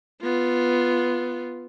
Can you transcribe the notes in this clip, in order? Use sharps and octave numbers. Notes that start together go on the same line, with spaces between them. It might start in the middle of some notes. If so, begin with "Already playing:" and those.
B3 F4